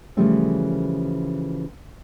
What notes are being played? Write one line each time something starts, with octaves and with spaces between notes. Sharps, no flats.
C#3 E3 F3 G3 A3 C#4